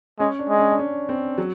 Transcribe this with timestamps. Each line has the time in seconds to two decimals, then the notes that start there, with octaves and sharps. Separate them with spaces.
0.19 G#3 C#4
0.39 D4
0.49 G#3
0.59 C#4
0.71 D4
0.79 C#4
1.09 C4
1.38 F#3